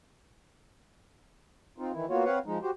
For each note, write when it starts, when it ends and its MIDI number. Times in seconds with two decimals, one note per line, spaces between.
1.78 1.92 60
1.78 1.92 63
1.78 1.92 65
1.93 2.06 51
1.93 2.06 52
1.93 2.06 64
2.09 2.24 58
2.09 2.24 59
2.09 2.24 65
2.09 2.24 66
2.09 2.24 73
2.25 2.39 60
2.25 2.39 71
2.25 2.39 73
2.25 2.39 77
2.25 2.39 78
2.46 2.58 53
2.46 2.58 56
2.46 2.58 63
2.62 2.71 66
2.62 2.71 67
2.62 2.71 72